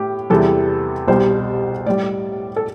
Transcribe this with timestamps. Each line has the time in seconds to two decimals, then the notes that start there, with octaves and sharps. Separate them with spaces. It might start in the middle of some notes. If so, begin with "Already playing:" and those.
Already playing: A2 G4
0.30 E2 C3 E3 G3 A4
1.07 C2 B2 G3 C5
1.86 A2 G3 D5
2.56 A4